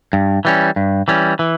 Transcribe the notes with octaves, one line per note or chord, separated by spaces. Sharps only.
G2
E3 G3 C#4
G2
E3 G3 C#4
E3